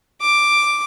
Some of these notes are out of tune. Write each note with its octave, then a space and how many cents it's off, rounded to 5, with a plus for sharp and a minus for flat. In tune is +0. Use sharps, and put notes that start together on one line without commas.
D6 +5